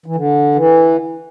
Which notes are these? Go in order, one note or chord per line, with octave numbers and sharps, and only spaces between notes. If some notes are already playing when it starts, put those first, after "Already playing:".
E3
D3
E3